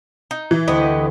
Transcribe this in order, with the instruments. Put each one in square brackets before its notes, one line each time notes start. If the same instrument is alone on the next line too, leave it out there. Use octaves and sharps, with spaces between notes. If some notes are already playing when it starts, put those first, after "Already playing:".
[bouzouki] D#4
[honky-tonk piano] E3
[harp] D2 [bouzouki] B3 G4 D#5